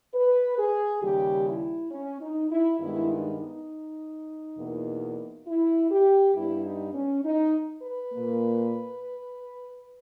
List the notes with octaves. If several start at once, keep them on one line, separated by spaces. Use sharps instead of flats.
B4
G#4
D#2 C#3 G3 G4
E4
C#4
D#4
E4
G2 D#3 G#3 B3 E4
D#4
D#4
E2 B2 A#3
E4
G4
G2 G3 B3 E4
D#4
C#4
D#4
B4
A#2 A#3